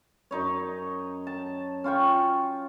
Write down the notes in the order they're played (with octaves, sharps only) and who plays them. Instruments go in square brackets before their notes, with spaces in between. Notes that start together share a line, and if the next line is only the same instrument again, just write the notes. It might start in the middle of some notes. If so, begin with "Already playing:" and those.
[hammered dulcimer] F#2 D#4 C#5
A5
C#4 F4 G5 C#6